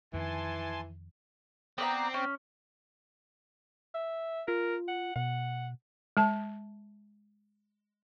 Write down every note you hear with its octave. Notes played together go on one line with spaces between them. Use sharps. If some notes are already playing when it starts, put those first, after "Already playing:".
F2 D#3 E3 G#5 A5 C6
B3 C4 D5 A#5
C#4
E5
F4 A#4
F#5
B2 F#5
G#3 A5